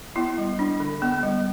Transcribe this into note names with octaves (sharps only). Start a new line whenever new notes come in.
B3 E4
G3
D4
D3
B3
G3